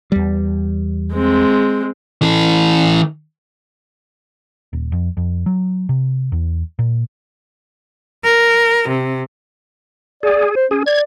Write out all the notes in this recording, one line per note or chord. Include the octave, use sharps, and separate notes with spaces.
E2 G3
G#3 C4
E3 A4
D#1
F2
F2
F#3
C3
E2
A#2
A#4
C3
G#4 D5
C5
C#4 G#4
D5 G#6